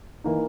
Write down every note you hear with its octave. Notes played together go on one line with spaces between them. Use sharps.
E3 A#3 D#4